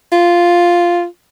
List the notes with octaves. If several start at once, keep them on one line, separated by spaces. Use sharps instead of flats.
F4